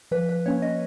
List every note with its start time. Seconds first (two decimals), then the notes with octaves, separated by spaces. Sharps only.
0.11 F3 B4
0.29 B4
0.46 A#3 C#4 C#5
0.62 D#5